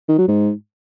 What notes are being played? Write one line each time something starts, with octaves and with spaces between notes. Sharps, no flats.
D#3
F#3
G#2